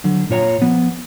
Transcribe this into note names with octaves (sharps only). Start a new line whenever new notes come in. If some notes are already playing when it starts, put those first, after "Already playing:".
D3 F#3
A#2 F4 C#5 G#5 A#5
F3 B3